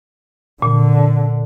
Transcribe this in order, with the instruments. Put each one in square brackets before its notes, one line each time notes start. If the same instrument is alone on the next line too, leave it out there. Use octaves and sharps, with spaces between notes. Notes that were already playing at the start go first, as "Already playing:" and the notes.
[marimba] A#2 [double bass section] D3